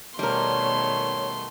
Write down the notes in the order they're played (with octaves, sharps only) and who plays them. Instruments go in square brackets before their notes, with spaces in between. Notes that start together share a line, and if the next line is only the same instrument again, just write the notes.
[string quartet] B2 D#3 A3 [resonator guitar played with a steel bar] G3 A#4 [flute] C#5 [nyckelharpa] C6